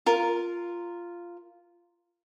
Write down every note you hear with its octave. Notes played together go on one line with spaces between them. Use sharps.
F4 A#4